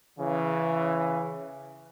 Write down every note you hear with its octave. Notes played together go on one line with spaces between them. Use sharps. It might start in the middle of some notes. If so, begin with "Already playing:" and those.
C#3 E3